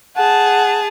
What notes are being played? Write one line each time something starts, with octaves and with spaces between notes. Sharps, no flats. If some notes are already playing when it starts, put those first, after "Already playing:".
G#4 F#5 A5